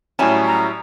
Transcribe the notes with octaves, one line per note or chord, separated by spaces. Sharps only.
A2 F#3 G3 C#4 E4 C#5 G#5 A5
A#5